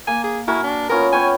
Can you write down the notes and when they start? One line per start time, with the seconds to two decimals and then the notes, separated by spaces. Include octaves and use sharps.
0.07 A#3 G#5
0.24 G#4
0.48 E4 F#4 A#4 G#5
0.64 D4
0.89 B3 C#4 F4 A#4
1.13 B3 C#5 G5 G#5